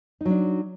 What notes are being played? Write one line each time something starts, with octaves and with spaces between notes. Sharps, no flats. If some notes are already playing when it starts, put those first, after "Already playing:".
F#3 D4 D#4